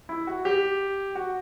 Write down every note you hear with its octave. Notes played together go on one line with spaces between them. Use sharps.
E4
F#4
G4
F#4